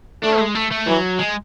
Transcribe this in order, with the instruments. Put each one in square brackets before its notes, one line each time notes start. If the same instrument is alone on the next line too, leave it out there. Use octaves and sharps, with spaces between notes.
[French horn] A3 [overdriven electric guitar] D4
[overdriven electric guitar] G#3
A3
A3
[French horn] E3 [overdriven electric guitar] F#3
[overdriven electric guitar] G#3